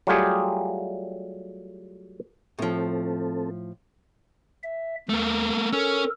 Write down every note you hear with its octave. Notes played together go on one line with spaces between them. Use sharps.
F#3 G3 A3 F4 G4 G#4
A2 F3 C4 A4
E5
D#2 A3 A#3
C#4 A4 A#4